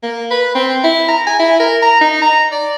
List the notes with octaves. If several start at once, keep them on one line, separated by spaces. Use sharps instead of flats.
A#3
B4
C4
E4
A#5
G#5
E4
A#4
A#5
D#4
A#5
D5